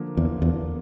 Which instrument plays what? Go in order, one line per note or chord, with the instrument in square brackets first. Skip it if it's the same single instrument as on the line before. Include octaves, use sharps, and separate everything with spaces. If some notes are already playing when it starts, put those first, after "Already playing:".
Already playing: [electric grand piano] D3 F3 A#3
[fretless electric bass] E2
E2